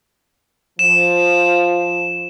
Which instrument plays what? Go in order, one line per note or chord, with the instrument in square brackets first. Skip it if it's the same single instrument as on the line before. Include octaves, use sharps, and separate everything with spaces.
[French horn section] F3 [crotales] E7